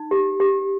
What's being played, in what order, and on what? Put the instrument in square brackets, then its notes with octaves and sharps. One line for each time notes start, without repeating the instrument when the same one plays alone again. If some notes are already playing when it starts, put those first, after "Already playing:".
Already playing: [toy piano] D#4
G4
G4